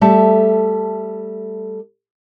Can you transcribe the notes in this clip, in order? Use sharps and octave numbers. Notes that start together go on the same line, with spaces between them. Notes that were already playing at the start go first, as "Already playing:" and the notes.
G3 A3 A4 E5 A5